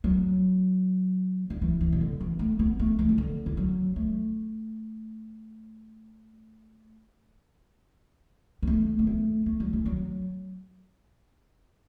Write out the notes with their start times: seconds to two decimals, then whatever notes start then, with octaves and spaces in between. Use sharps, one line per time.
0.04 F#3
1.50 D3
1.62 E3
1.81 E3
1.92 B2
2.01 D3
2.20 E3
2.39 A3
2.59 B3
2.79 A3
2.99 E3
3.09 E3
3.18 D3
3.46 E3
3.57 F#3
3.96 A3
8.62 B3
8.67 A3
8.99 B3
9.07 A3
9.46 A3
9.60 F#3
9.73 E3
9.86 F#3